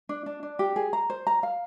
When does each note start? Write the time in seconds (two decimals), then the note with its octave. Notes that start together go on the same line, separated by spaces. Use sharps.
0.09 D4
0.26 D4
0.43 D4
0.59 G4
0.76 G#4
0.93 A#5
1.10 C5
1.27 A#5
1.43 F5